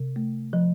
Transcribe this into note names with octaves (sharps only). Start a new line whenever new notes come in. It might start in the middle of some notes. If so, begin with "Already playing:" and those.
Already playing: C3
A3
F3